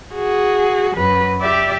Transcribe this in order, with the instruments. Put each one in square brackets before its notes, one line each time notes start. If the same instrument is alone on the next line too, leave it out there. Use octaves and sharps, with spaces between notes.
[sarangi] F#4 [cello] G#4
[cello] F#2 [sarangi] B4
[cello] G4 D5 [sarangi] E5